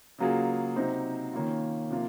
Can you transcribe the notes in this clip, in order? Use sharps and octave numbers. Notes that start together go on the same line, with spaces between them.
C#3 F#3 A#3 F4 G#4
C3 F#3 C4 D#4
D#3 A#3 C#4 F4
C3 F3 A#3 F4